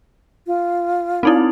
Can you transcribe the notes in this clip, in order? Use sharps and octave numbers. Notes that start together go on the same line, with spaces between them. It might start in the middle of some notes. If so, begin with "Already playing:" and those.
F4
C4 D#4 E4